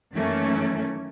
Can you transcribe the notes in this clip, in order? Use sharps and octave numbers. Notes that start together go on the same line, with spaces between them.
F#2 D#3 E3 A3 A#3 C#4